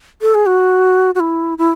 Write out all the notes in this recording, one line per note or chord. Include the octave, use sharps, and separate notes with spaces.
A4
G#4
F#4
F#4
E4
E4